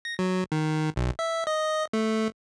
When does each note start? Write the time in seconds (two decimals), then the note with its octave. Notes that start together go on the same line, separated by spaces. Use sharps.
0.05 A#6
0.19 F#3
0.52 D#3
0.96 B1
1.19 E5
1.47 D#5
1.93 A3